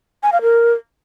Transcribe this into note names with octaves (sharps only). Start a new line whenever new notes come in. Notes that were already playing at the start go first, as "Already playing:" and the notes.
G#5
F5
A#4